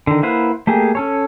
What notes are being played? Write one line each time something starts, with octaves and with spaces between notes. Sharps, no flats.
D3 D#3
A#3 E4 B4 C5 F#5
A3 A#3 G4 G#4
C#4 A4 C#5